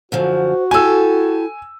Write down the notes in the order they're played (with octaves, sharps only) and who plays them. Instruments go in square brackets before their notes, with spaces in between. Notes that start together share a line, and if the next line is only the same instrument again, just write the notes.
[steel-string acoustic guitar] F#2 D3 F3 [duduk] F#4 [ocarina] C5
[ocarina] E4 [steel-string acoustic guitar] G4 A4 [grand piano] G#5 E6